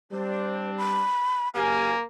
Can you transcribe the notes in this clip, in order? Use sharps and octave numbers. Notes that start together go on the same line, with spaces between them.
G3 C4 D4 C5
B5
F#1 A#3 G4 F5 G#5